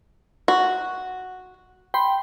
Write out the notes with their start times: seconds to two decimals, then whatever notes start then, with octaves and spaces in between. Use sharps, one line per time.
0.48 F#4
1.94 G5 B5 C6